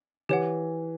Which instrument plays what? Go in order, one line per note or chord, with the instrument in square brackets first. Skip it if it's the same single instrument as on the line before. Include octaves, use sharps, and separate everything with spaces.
[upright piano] E3 [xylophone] G4 C#5 F#5